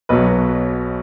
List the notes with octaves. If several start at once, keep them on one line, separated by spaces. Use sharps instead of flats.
B1 B2 F#3 B4 D#5